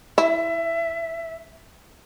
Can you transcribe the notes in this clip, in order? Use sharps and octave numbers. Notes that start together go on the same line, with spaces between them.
E4 E5